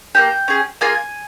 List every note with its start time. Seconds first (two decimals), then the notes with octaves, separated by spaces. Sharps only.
0.15 A#3 C#4 G4 G5
0.48 C#4 G#4
0.81 A#3 F4 G#4 G#5